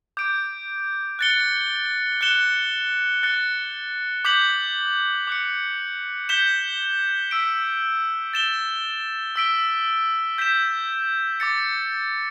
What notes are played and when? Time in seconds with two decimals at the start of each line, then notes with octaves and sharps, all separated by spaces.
0.17 D6 G6 D7
1.19 F#6 A6 C#7 G7
2.21 F#6 C#7 E7 G7
3.23 F#6 A6 C#7 G7
4.25 D6 G6 B6 F#7
5.27 D6 F#6 C#7
6.29 G6 B6 E7 G7
7.31 E6 B6 D7
8.33 A6 E7 G7
9.36 E6 B6 D7 G7
10.38 G6 B6 E7
11.40 D6 A6 C#7